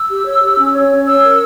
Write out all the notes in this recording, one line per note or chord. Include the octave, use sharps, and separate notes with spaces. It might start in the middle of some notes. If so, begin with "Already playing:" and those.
Already playing: E6
G4
C#5
G4
C#4
C#5
C#4
C#5 E6
A#4